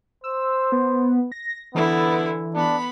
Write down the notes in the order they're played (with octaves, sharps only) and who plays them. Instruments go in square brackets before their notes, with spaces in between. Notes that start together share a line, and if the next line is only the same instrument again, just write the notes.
[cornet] C5 [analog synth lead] E6
[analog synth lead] B3
A#6
[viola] D3 E4 [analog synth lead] E3 [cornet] B3
[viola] B3 B5 [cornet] D4